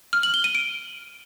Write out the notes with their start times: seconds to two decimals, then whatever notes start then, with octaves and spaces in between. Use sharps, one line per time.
0.13 F6
0.23 F#7
0.34 G7
0.44 D#7
0.55 D7